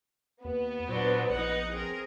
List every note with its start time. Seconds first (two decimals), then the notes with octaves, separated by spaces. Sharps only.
0.44 D#2 B3
0.89 A#2 F#3 D4 C5
1.29 A#1 D#4 B4 F#5
1.72 C4 G#4 A#4